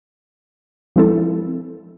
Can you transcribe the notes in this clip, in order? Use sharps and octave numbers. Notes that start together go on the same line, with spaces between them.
F3 G#3 C4 E4 A4